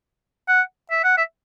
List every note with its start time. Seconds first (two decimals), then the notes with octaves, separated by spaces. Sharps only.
0.48 F#5
0.91 E5
1.04 F#5
1.18 E5